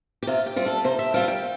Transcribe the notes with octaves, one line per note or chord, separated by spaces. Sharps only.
G4
C3 F4
G4
G3 C4 F4
A4
C3 C5
E5
G3 C4 F4 F5
G5